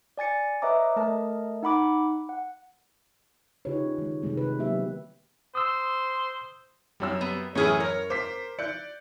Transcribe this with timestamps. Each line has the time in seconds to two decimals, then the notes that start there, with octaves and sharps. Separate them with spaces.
0.18 D5 G#5 A6 C#7
0.62 B4 C#5 D#5 E5 A#5 D6
0.96 A3 A#4 D#5 A5
1.63 D#4 F#5 B5 D6
2.29 F#5
3.65 C#3 D#4 F4 G4 B4 C#5
3.86 C#4
3.98 D#3 G#3
4.22 C3 D#3 G3 G#3 C4
4.37 B4
4.59 F#3 A#3 B3 G4 E5
5.55 C5 D#6 E6
7.00 F#2 G3 G4 C#5 E6
7.21 B3
7.55 F#2 A2 E3 C#4 E4 G#4 C#5 F6
7.80 A#4 C#5
8.10 C5 D6 B6
8.59 D5 F#6 G6 C#7